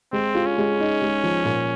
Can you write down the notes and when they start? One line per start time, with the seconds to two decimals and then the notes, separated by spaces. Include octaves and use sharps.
0.13 G#3 C4
0.35 F4
0.46 C#4
0.58 G#3
0.80 D#4
1.02 G#3
1.23 F3
1.44 A#2